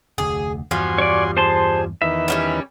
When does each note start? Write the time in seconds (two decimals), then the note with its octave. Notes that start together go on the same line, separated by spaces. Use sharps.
0.18 F1 D2 G#4
0.71 E2 G2 F3 G3 F#4 G#5 C6
0.98 C#5 D5
1.37 G#4 C5 A5 C6
2.02 E2 D#3 B4 E5
2.28 G3 A#3 C#4